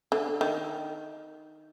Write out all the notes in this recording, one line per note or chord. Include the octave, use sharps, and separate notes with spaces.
D3
D#3